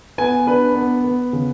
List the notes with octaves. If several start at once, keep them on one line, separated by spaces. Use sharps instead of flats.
B3 G#5
D4 B4
B3
B3
C#3